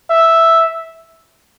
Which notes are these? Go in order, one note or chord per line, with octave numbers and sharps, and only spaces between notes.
E5